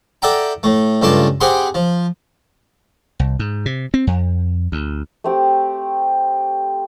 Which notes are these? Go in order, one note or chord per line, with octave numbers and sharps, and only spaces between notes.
A4 D5 E5 F#5 G5 A#5
A2 A3
C#2 G2 A3 F4 D5 A5
C4 G4 G#4 F#5 B5 C6
F3
C2
G#2
C3
C4
F2
D2
A3 C4 G4